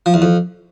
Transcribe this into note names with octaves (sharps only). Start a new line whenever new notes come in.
F3
E2
F2